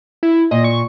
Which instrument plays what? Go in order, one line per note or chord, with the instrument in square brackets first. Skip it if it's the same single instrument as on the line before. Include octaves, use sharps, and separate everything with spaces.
[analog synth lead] E4
[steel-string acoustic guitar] A#2 [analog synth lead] D#5
[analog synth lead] C#6